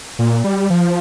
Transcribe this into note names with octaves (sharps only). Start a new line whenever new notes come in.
A#2
G3
F3